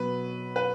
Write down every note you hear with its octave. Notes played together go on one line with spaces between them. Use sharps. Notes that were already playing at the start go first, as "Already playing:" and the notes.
Already playing: B2 F#3 B3 B4
B4